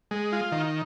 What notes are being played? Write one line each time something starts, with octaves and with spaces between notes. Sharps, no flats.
G#3
F4
D#3